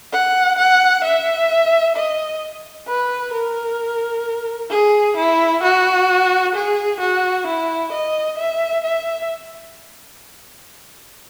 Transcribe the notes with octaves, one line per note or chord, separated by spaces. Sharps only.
F#5
F#5
E5
D#5
B4
A#4
G#4
E4
F#4
G#4
F#4
E4
D#5
E5
E5